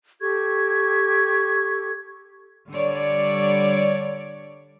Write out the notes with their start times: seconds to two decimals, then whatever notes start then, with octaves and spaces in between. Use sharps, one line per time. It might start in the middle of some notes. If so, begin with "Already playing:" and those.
0.22 G4 A4 C#6 G#6
2.70 D3 G3 C#5 D5